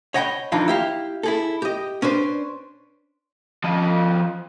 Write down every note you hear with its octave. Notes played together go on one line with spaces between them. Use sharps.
C#5 D#5 F#5 G5 A#5 B5
F2 E3 D4 D#4 F4
E4 G4 F5
E4 G#4 A4
G4 D#5
C#4 D4 B4 C5
F3 D#5